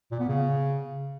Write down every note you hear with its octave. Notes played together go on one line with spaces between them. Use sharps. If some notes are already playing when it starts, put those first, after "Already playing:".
A#2
B3
C#3